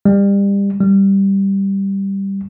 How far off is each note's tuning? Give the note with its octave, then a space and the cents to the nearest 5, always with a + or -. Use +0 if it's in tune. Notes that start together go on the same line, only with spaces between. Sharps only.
G3 +30
G3 +0